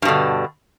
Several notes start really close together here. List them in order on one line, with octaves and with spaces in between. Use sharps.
G2 B2 D3